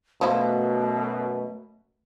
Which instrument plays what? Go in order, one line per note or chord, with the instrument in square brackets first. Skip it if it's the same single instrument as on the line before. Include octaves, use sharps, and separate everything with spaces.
[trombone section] F#2 B2 [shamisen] F3 E4 [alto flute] A3